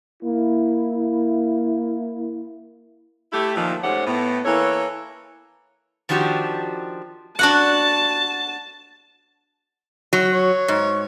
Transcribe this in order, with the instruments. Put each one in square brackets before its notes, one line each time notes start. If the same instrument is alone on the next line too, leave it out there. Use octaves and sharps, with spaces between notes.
[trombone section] A#3 E4
[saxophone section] A3 E4 G4
A#2 D#3 F3
G#2 A3 C#4 G4 C5 F#5
A2 B3
E3 A#3 A4 C#5
[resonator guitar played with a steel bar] D#3 F3 D4 F#4 G4
[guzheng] D4 F#4 F#5 [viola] A5
[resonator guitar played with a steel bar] F#3
[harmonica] C#5
[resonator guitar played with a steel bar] G#2